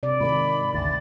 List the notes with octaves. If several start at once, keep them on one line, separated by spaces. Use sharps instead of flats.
C3 D5
G#2 D#3 B5
G#1 D2 A6